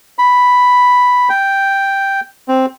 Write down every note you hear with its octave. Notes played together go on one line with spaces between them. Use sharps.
B5
G5
C4